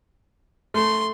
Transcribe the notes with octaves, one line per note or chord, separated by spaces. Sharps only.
A3 C6